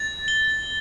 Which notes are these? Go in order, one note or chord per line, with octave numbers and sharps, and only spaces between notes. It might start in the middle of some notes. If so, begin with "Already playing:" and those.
Already playing: A6
G7